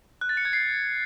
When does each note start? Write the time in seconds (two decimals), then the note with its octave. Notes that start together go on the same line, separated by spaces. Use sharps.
0.21 F#6
0.29 A6
0.37 C#7
0.45 G#6
0.53 C7